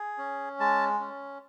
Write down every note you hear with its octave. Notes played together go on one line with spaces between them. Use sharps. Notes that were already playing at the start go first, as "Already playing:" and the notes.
Already playing: G#4
C#4
G#3 A5
C#4